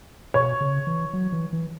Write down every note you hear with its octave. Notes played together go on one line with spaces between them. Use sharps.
B2 C#5
C#3
E3
F#3
E3
E3